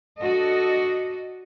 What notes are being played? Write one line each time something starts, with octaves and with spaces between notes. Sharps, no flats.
D4 F#4 A4 D#5